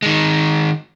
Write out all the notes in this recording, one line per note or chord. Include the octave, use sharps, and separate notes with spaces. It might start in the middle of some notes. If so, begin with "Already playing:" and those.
D#3 G#3